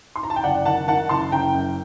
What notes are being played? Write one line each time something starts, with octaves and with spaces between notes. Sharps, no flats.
C6
A#5
A5
G5
F#1 D5 F#5
D#3 F#5 A5
D#3 F#5 A5
F#1 A5 C6
F#1 G5 A#5
F#2